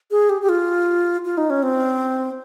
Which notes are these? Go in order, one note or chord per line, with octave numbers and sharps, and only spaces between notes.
G#4
G4
G4
F4
F4
D#4
C#4
C4